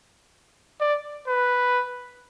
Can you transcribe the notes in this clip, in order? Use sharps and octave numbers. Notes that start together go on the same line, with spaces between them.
D5
B4